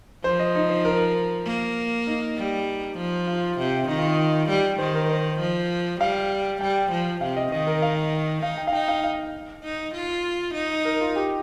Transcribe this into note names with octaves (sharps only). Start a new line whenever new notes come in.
F3 C5
D#5
D#4
C5
A#4
A#3
D#4
G3
F3
F4
C3
D#3 D#4
F4
D#5
G3
D#3 C5
A#4
C5
F3
G3 F5
G3 G5
F3
C3 F5
D#5
D#3 D#5
A#4
F5
D#4 F5
G5
F5
D#4 G5
F5
F5
D#4
F4
D#4
A#4
F4
G4